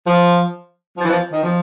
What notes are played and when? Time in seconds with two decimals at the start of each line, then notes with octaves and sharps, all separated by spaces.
0.07 F3
0.97 F3
1.04 E3
1.10 F3
1.32 D#3
1.43 F3